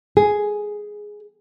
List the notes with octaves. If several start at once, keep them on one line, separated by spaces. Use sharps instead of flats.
G#4